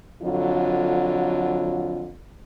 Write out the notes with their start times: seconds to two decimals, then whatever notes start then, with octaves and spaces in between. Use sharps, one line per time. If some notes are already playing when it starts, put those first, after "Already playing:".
0.22 F2 D3 F#3 F4